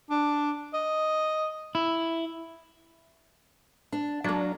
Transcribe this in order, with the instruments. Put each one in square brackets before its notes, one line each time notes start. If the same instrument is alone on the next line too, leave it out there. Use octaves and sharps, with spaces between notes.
[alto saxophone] D4
D#5
[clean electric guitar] E4
[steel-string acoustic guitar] D4
[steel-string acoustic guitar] F#3 A#3 [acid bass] D4